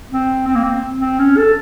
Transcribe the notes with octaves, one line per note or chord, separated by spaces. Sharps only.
C4
C4
A#3
C4
C4
C#4
A4